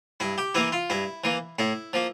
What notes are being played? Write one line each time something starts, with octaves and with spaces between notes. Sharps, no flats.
G2 E4
G4
E3 A#3 E4
F4
G2 E4
E3 A#3
A2 E4
F3 A#3